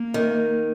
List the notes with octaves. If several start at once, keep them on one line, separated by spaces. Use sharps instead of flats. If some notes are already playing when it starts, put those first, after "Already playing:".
Already playing: A#3
D#3